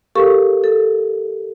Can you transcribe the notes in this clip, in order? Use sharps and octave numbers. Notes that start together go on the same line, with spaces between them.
G4 A4 A#4 F5 C#6
A4